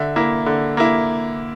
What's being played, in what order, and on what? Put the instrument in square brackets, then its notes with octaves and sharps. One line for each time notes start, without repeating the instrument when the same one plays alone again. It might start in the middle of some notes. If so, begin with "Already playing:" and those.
Already playing: [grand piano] D3 E5
A#3 E4
D3
A#3 E4